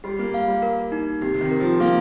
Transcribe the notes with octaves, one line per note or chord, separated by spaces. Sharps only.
G3 G4
A#3
F5
G3
A#4
D#4
C3 G4
C3
D#3
A#4
F3
A#3 F5